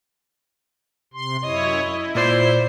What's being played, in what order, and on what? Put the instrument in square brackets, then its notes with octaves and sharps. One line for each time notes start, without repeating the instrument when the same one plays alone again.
[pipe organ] C3 C6
[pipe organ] F#2 E4 C#5 [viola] D#5
[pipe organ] E4
[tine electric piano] A#2 D5 C7 [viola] C5